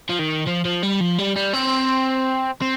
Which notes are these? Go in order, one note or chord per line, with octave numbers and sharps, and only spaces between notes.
F3
D#3
F3
F3
G3
F3
G3
G3
C4
C4